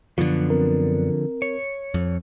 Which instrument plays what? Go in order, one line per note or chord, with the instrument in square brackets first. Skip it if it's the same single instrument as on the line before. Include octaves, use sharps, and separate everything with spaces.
[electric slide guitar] F#2 B3 D4 [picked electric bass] D3 F3
[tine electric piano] C4 A#4
[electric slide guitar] C#5
[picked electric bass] F2